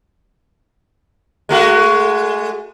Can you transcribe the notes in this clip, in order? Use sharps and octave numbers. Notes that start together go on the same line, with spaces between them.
G#3 A3 F#4